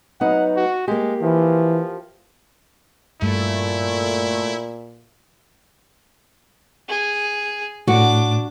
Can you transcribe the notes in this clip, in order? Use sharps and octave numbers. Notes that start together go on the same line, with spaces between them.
F#3 B3 D#4 F#5
F#4
G#3 A#3 G4
E3 F3
G2 A#2 A3 E4
G#4
A2 D4 F#4 D6